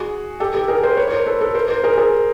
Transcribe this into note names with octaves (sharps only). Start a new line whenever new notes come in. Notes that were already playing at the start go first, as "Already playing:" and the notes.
Already playing: F#4 G#4
G4 A4
G4 A4
G#4 A#4
A#4 C5
B4 C#5
C#5
A#4 C5
A4 B4
A4 B4
A#4 C5
A#4 C5
G#4 A#4
G#4 A#4